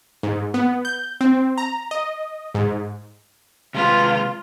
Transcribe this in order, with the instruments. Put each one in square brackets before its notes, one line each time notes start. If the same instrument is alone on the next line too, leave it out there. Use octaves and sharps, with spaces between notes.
[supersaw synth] G#2
B3
G6
C4
A#5
D#5
G#2
[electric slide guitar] C3 G#3 B4 [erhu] F4